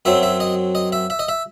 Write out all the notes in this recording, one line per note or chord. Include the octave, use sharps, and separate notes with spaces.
F#2 F#3 C4 E5
E5
D#5
D#5
E5
E5
D#5
E5